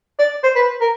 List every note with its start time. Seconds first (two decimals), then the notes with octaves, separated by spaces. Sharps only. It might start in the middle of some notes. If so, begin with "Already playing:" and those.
0.19 D5
0.43 C5
0.55 B4
0.81 A#4